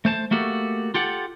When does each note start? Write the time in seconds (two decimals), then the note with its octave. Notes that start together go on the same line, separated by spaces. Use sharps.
0.05 A3 C5 A5
0.31 A3 A#3 F#4 G4 A4
0.94 F4 G4 A4 F#5